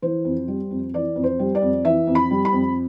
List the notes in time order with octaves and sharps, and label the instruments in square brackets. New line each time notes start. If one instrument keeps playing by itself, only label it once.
[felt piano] E3 C5
F2
G3
F2
E3 D5
F2
C5
G3
D5
F2
E3 E5
F2
B5
G3
B5
F2